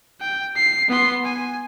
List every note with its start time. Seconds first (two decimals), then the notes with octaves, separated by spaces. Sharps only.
0.21 G5
0.56 C7
0.89 B3 C6
1.25 G#5